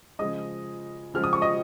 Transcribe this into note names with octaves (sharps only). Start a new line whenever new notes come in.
C#3 F3 G#3 D#5 D#6
C#3 F3 G#3 F6
D#6
C#6
D#5 D#6